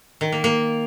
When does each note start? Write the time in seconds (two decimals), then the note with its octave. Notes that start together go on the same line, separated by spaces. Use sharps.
0.21 D#3
0.32 A#3
0.44 A#3